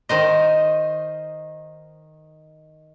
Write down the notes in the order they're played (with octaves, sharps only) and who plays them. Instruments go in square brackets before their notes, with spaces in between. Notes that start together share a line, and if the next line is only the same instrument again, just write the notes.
[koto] D#3 C5 D#5